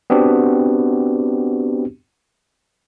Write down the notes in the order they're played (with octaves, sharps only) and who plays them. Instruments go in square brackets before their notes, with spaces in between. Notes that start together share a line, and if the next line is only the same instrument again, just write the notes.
[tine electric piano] B3 C4 D4 F#4 G4